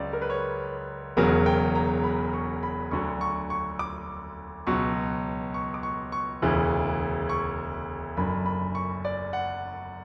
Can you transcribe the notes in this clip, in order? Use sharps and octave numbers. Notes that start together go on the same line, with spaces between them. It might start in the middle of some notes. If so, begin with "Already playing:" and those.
Already playing: C#2 C#3 F#3 D5
A#4
B4
C#5
E1 E2 C#3 F#3 A#4
G5
A#5
B5
C#6
B5
D2 D3 F#3 C#6
C#6
C#6
D6
C#2 B2 F#3 C#6
C#6
D6
C#6
C#6
E1 D2 C#3 E3
C#6
F#1 F#2 D3 B5
B5
C#6
D5
F#5